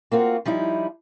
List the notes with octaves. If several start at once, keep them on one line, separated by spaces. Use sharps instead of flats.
A#3 C4 F4 F#4
F3 G3 D#4 E4